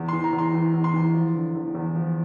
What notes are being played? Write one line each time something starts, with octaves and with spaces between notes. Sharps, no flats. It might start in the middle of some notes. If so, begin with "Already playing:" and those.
Already playing: E2
C6
E3
A#5
E2
C6
E3
E2
C6
E3
F3
D3
E2
E2
F3